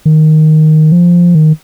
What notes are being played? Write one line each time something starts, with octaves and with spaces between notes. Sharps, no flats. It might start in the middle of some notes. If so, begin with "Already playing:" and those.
D#3
F3
D#3